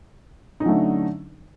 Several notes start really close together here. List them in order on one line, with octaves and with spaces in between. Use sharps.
D#4 C#4 F#3 A3 D3